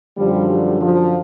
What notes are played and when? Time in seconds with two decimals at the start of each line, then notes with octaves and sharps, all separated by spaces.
0.17 F#2 D3 F3 G3
0.49 G3
0.81 F3